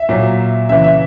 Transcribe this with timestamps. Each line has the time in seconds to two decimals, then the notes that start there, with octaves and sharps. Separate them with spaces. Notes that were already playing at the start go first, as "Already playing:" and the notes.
Already playing: E5
0.09 A#2 F#3
0.69 C#3 E3 E5
0.84 E5